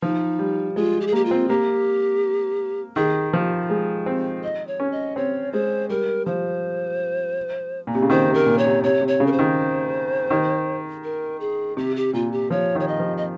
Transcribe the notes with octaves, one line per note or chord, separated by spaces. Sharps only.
F3 D#4
G3
G#3 F4
G4
G#4
A#3 G4
F4
C4
A#3 G4
D#3 G#4
F3
G#3
C4
D#5
C#5
C#4
D#5
C4 C#5
G#3 C5
G3 A#4
F3 C5
A#2
C3
C#3
D#3 C5
C3
A#4
A#2
C#5
C3
C3 C#5
C3
C#5
C#3
A#4
C5
D#3
D#3
A#4
G#4
C3 G4
G4
A#2 F4
G4
F3 C#5
D#3 C#5
D#5
F3
D#5